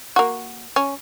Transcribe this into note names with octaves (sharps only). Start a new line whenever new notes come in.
A#3 F#4
C#4